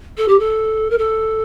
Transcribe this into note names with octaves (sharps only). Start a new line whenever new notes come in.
A4
G4
A4
A#4
A4